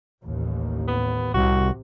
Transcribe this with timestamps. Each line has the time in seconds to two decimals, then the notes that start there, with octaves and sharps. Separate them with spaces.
0.23 A1 D#2
0.88 B3
1.34 C2 C3 F#4